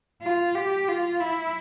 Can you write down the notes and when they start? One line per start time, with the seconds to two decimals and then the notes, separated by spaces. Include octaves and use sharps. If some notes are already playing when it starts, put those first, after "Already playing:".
0.22 F4
0.55 G4
0.88 F4
1.20 E4